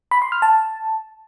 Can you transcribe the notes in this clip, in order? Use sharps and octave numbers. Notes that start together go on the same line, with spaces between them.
B5
C6
F6
A5